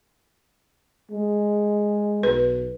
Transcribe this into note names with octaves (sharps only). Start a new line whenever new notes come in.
G#3
B1 B4